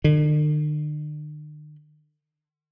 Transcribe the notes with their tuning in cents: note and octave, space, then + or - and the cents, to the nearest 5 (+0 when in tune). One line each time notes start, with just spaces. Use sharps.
D3 +45